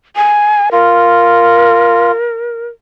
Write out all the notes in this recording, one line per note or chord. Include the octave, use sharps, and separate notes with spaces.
G#5
F4 A#4